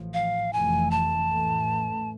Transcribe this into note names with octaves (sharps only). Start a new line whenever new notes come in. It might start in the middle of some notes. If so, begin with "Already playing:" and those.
Already playing: A1 A2 F3
F5
F1 F2 E3 A3 G#5
A5
A1 A2 E3 A3